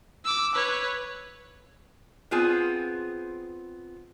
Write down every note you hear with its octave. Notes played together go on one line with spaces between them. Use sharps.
D6 E6
B4 C#5
B3 C4 F4 G#4